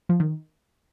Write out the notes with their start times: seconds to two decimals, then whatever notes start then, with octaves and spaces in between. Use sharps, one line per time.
0.09 F3
0.20 D#3